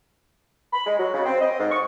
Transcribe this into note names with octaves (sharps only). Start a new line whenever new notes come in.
B5
G#3
F#3
C#3
C4
D#5
G#2
C#6